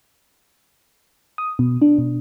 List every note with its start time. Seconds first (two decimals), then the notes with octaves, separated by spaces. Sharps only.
1.38 D#6
1.59 B2
1.82 D4
1.98 B2